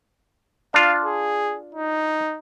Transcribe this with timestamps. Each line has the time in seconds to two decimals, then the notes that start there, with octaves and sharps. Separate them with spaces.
0.74 D4 F4 F5
1.04 G#4
1.75 D#4